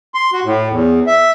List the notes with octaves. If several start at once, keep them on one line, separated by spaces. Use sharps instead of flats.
C6
F#4
A2
E2
E5